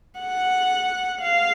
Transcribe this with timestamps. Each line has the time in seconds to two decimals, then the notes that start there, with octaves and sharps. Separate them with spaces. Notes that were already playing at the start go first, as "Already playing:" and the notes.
0.20 F#5
1.22 F5